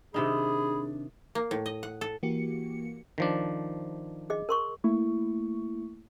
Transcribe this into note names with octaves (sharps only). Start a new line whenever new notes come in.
C3 D#3 D4 D#4 G#4 B5
A#3
A2
D#5
F#5
A4
E3 A#3 F#4 G4 C#7
D#3 F3 D4
G#4 D#5
A#4 C6 C#6
A3 A#3 E4 C#6